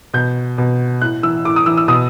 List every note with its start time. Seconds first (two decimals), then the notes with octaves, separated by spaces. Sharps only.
0.14 B2 G6
0.58 B2
1.01 A2 F#6
1.23 E3 E6
1.45 A2 D6
1.56 D#6
1.66 E3 E6
1.77 E6
1.88 B2 D#6